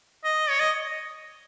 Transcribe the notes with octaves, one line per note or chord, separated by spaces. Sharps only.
D#5
C#5
D#5